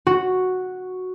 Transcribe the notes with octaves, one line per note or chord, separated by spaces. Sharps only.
F#4